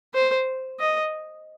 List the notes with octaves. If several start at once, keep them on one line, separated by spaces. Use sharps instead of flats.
C5
D#5